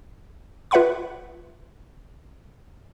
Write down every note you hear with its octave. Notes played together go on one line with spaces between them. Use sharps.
F4 B4 E5 F#5 B5 C#6